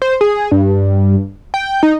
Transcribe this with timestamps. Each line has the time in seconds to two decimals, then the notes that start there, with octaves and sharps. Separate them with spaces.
0.02 C5
0.21 G#4
0.51 G2
1.54 G5
1.83 D#4